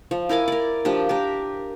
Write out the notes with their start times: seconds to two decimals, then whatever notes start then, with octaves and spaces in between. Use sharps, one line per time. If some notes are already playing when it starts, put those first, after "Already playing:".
0.11 F3
0.29 E4 A#4 G#5 D6
0.48 A#4 D5
0.85 F3 D4 G4
1.09 G4 A#4